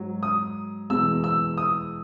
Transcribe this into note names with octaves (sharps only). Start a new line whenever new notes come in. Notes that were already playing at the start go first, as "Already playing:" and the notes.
Already playing: G#2 F#3
D#6
E2 B2 G#3 E6
E6
D#6